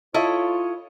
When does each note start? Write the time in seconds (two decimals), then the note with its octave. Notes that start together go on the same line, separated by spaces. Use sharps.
0.14 E4 F4 A4 C#5 D#5